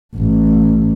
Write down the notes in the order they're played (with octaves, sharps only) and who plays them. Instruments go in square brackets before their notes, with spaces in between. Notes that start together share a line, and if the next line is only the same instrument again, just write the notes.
[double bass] A1